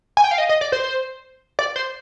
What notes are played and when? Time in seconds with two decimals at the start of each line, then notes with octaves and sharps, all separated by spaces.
0.17 G#5
0.24 G5
0.31 F5
0.38 D#5
0.49 D#5
0.61 D5
0.72 C5
1.59 D5
1.76 C5